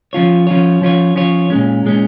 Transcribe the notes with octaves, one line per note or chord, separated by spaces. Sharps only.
F3 C#4 F4 C#5
F3 C#4 F4 C#5
F3 C#4 F4 C#5
F3 C#4 F4 C#5
A#2 G#3 C#4
A#2 G#3 C#4